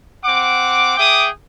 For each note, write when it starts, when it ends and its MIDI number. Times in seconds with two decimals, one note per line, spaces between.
0.25 0.95 60
0.25 0.95 78
0.25 0.95 86
0.98 1.28 68
0.98 1.28 76
0.98 1.28 79
0.98 1.28 86
0.98 1.28 87